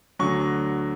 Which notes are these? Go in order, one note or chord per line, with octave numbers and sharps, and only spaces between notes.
D2 D3 F#3 C#6